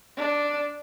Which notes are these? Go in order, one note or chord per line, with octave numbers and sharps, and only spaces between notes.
D4